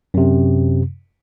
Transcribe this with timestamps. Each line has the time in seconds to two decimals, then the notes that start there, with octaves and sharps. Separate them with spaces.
0.14 F#2 C3